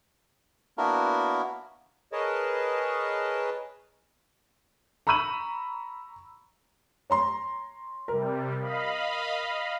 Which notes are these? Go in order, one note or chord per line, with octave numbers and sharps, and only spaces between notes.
A#3 B3 D4 E4 F#4 A#4
G#4 A#4 B4 C#5 D#5 A5
A#5 B5 C#6 E6 D#7 F#7
C#5 A#5 C6
C3 G3 A#4
D#5 F5 B5